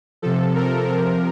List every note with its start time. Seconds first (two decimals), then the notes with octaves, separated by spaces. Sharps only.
0.22 C3 F3 A4
0.55 A#4
0.88 C3 F3 A#4